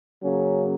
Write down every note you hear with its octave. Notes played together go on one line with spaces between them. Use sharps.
C#3 F#3 A#3 C#4